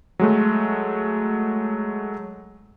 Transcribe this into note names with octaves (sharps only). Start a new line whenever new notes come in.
F#3 G#3 A3